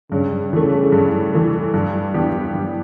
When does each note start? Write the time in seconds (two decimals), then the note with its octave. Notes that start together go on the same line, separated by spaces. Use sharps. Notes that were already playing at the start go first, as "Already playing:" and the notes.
0.12 G2 C#3
0.52 C#3 E3 A3
0.92 G2
1.33 E3 A3
1.74 G2
2.14 E3 B3 D4 G4
2.55 G2